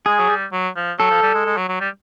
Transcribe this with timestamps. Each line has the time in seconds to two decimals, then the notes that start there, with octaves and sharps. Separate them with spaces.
0.06 G#3 G#4
0.19 F#3
0.29 G3
0.52 F#3
0.76 F3
0.99 F#3 A4
1.10 F3
1.22 G3
1.34 G#3
1.46 G#3
1.57 F#3
1.69 F#3
1.80 G3